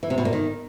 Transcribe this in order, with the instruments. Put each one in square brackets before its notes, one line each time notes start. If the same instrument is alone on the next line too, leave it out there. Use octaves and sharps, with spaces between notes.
[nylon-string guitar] E3
C3
B2
A#2
D#3